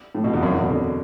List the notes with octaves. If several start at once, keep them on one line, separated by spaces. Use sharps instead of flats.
A2
B2
E2
F#2
E2
B2
D3